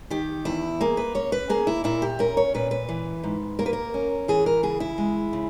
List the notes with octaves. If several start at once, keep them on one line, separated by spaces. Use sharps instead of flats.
D#3 G4
E2 E4
A#3 G#4
B4
C#4 C#5
B4
A#3 G#4
E4
A#2 E4
G4
C#4 A#4
C#5
A#2 B4
B4
E3
G#2
A#3 A#4
B4
A#4
C#4
E3 G#4
A#4
C#3 G#4
E4
G#3
C#3